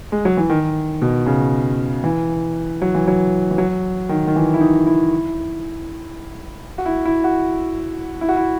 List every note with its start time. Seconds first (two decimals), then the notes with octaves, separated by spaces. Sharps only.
0.12 G#3
0.25 F#3
0.37 E3
0.50 D#3
1.02 B2
1.27 C#3
2.04 E3
2.82 F#3
2.95 E3
3.08 F#3
3.51 E3
3.58 F#3
4.09 D#3
4.27 D#3
4.36 E3
4.54 E4
4.61 D#4
4.87 E4
6.78 F#4
6.86 E4
7.05 E4
7.24 F#4
8.21 E4
8.28 F#4
8.37 E4